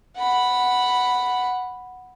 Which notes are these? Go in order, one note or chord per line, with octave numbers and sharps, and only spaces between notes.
F#5 B5